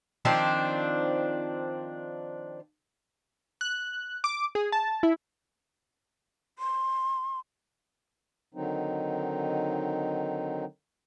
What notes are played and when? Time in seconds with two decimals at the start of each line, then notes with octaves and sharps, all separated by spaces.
0.25 D#3 F3 C4 D4
3.61 F#6
4.24 D6
4.55 G#4
4.72 A5
5.03 E4
6.59 C6
8.54 D3 D#3 F#3 C4 D#4